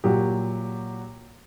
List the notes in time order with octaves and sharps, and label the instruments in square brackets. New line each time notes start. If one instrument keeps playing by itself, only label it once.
[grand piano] A#2 F#3 G4